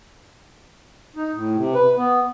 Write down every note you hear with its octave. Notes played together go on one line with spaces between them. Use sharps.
D#4
A2
C3
B4
B3